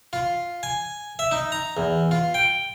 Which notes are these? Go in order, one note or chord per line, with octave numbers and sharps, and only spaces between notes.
F4
G#5
E5
D#4
A#5
E2
F4
G5